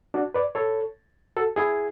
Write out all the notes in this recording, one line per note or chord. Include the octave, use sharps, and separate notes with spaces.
D4 F#4
B4 D5
A4 C#5
F#4 A4
E4 G#4